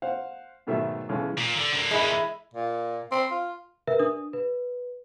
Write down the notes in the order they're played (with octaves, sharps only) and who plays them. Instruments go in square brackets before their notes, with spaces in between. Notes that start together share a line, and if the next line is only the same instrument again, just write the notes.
[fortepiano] C5 F5 F#5
G#2 B2 D#3 F#3 A3 E5
B1 C#3 E3 G#3
[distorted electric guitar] A#2
D3
D3 A#3
[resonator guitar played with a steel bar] G#3 E4
[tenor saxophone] A#2
C4
F4
[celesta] A#4 B4 E5
D4 D#6
B4